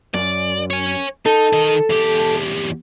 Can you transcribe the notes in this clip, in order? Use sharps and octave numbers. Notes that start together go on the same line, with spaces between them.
F#2 D5
C#5 G#5
D#4 A4
D#3 D#5
E2 G4